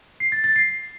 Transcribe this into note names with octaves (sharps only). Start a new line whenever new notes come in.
C7
A6
A6
C7